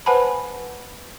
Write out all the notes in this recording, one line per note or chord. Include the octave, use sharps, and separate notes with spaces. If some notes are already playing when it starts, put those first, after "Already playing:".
B4 C5 F#5 G#5 A5 B5